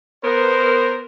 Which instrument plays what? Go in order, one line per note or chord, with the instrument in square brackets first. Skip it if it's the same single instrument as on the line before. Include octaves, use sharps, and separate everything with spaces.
[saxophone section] B3 A#4 [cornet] C5